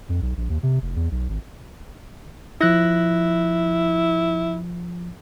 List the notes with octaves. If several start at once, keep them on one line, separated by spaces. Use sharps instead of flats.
F2
B1
A#1
D#2
C3
F1
E2
B1
G#1
F3 E4 F#6 A#6